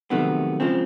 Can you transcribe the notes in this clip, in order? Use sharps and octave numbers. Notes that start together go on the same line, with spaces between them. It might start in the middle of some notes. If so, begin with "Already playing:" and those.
F2 C3 D#3 F#3 A3 B3
C#3 F3 G#3 C4